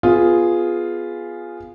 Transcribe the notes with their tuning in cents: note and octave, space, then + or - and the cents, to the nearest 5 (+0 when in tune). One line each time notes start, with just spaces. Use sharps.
B3 +0 F4 +0 G#4 +0